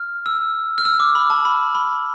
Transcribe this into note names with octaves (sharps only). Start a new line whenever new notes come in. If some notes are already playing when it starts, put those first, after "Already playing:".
Already playing: F6
E6
F6
E6
D6
B5
A5
B5
B5